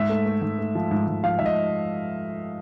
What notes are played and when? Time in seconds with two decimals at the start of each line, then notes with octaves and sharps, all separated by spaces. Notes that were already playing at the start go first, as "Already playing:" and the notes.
Already playing: G#2 E5
0.09 A3
0.26 A3
0.42 G#2
0.59 A3
0.75 F3
0.91 G#2
1.08 G#2
1.24 F3 F5
1.39 G#2 E5
1.46 D#5